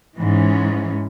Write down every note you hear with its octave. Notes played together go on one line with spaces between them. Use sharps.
G#2 E3 C#4